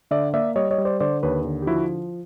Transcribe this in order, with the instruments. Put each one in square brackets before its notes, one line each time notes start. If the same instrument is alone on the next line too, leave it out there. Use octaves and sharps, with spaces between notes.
[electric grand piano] D3 D5 E5
A#3 D5 E5
G3 C#5 D#5
C#5 D#5
G3
C5 D5
D3 C5 D5
D#2 B4 C#5
D3
G4
F3 E4 F#4